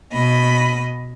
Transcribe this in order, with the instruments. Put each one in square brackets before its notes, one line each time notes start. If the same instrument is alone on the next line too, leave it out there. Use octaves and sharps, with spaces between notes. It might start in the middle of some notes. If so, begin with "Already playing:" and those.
[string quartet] B2 D#5 B5